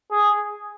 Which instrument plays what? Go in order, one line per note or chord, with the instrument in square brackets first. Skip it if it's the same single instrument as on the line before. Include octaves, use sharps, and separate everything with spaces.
[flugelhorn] G#4